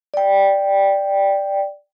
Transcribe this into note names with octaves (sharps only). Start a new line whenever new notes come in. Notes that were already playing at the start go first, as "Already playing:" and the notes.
D5 G5